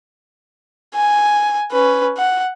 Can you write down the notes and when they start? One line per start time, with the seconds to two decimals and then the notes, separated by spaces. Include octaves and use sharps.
0.95 G#5
1.72 C#4 B4
2.17 F#5